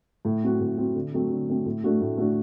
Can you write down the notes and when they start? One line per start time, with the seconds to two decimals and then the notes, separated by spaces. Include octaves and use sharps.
0.25 A2
0.43 F#3 C4 F#4
0.61 A2
0.78 F#3 C4 F#4
0.95 D3
1.13 F#3 A3 C4
1.30 D3
1.48 F#3 A3 C4
1.66 A2
1.84 A3 D4 F#4
2.01 A2
2.18 A3 D4 F#4